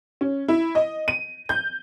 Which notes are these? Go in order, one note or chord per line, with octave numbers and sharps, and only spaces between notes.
C#4
E4
D#5
D#7
G6